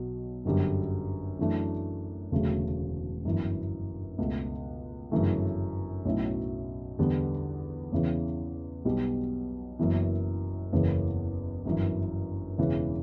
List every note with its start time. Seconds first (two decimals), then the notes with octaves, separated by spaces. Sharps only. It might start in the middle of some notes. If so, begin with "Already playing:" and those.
Already playing: B1 B2 F#3
0.45 G1 F#2 D3 G3
1.39 F#2 E3 A3 D4
2.31 E1 D2 C#3 F#3 A3
3.25 G1 F#2 E3
4.18 C#2 B2 A3
5.11 G1 F#2 C#3 E3 A3
6.05 B1 A2 F#3 C#4 E4
6.99 E2 D3 G3 B3
7.92 E2 C#3 E3
8.85 B1 B2 G3
9.79 F#1 F#2 E3 B3
10.72 F#1 E2 C#3 E3 B3
11.65 G1 F#2 E3
12.58 E1 E2 C#3 E3